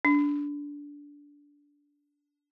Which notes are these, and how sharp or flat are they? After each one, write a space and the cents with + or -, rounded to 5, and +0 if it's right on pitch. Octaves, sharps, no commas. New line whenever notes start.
D4 -20